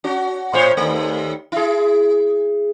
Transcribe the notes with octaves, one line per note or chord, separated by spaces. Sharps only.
C#4 F#4
A2 C5 C#5
D#2 A3
E4 G#4